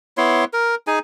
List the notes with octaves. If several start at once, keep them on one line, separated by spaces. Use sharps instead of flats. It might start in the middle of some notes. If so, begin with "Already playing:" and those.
B3 E4 C#5 C6
A#4
D#4 G#4 G#5